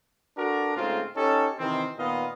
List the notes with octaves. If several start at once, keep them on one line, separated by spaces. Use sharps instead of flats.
D4 F#4 A4 A#4
G#2 C#3 A3 C4 F4
C#4 D#4 G4 A4
C3 D#3 E3 C4
A#2 D#3 B3 D#5 F5